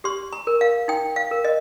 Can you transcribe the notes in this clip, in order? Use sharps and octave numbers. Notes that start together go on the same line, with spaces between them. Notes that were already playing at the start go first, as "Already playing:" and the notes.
G4 C6
A#5
A#4
F5
D#4 G5
F5
A#4
D#5